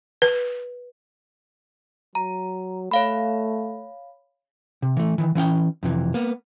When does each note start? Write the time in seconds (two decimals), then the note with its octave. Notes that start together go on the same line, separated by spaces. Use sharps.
0.22 B4
2.15 F#3 A#5
2.91 A3 C#5 F5 B5
4.82 C3
4.97 E3 A3
5.18 D#3 E3
5.35 E3 C#4 F#5 G5
5.83 F2 C3 E3
6.14 A#3 B3